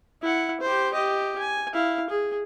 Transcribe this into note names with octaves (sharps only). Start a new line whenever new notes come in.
E4 F#5
G4 C5
G4 D#5
G#5
E4 F5
G#4